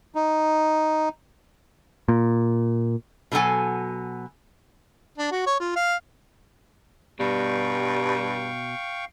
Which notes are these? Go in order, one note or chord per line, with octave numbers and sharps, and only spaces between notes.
D#4
A#2
B2 D3 F#3 A4 G#5
D4
F#4
C#5
F4
F5
G2 B2 G3 F5 G5 C#6